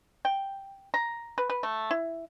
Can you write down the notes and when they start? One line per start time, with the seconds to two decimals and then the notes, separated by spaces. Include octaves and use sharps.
0.25 G5
0.94 A#5
1.38 B4
1.50 B4
1.63 A3
1.91 E4